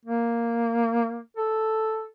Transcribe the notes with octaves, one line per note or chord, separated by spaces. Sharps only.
A#3
A4